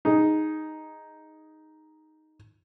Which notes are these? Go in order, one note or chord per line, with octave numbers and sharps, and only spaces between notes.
D#4 G#4